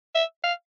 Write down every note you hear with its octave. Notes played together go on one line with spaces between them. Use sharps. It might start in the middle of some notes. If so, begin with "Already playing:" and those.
E5
F5